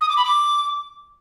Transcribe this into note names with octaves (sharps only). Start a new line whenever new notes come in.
D#6
D6
B5
D6